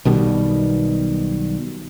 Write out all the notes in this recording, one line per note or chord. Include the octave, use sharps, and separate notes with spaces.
B1 B2 D#3 G3